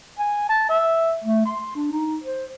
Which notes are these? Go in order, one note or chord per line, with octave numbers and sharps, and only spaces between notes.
G#5
A5
E5
A3
C6
D4
D#4
C5